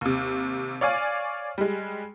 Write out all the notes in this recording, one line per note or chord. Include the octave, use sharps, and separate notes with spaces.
D#2 C3
C#5 D5 F5 G#5
G3 G#3